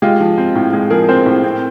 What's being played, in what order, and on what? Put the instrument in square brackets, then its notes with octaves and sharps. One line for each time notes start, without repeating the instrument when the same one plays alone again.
[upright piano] G#3 F4 G4
F3
C4
A2
G#3
F3 G#4 A#4
C4 A#4 C5
A2
C4